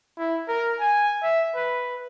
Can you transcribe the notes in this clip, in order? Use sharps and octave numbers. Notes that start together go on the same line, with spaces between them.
E4
A#4
G#5
E5
B4